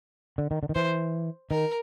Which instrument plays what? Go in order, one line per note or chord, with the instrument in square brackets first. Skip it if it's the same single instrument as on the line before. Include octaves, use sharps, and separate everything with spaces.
[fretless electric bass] D3
D#3
D3
D#3
[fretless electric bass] E3 [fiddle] C5
[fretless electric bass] D#3 [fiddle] A#4